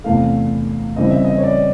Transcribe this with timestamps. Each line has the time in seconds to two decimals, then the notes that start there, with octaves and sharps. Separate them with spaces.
0.04 E2 C3 E3 A3 F5
0.96 C#3 E3 G3 C4 D#4 D#5
1.11 E5
1.24 D#5
1.38 C#5
1.44 D5